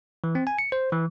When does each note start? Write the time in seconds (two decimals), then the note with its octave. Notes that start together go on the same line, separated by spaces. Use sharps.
0.24 E3
0.35 C4
0.47 G#5
0.59 C#7
0.72 C5
0.92 E3